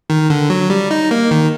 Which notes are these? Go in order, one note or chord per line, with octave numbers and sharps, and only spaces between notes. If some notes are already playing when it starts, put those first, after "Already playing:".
D#3
D3
F#3
G3
D#4
A#3
D#3